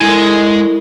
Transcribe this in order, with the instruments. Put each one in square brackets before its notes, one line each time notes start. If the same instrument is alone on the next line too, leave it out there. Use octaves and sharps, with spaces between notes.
[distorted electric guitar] G#3 G#5 [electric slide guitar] E4 A4 A#4